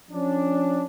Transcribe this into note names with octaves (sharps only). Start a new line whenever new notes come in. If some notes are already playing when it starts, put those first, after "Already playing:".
F3 C#4 D4